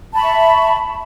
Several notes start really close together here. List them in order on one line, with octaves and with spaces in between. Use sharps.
A5 B5 C#6 E5